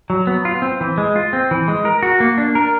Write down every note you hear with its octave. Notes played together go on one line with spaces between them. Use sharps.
F#3
B3
F4
C4
E3
G#3
F4
C4
E3
G#3
A#4
F#4
A#3
D4
A#4